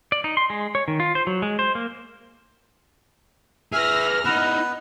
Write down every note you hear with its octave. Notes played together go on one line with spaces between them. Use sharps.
D5
D#4
C6
G#3
C#5
D#3
F4
C5
F#3
G#3
C5
A#3
G#4 B4 E5 F6 A#6
B3 D#4 E4 B4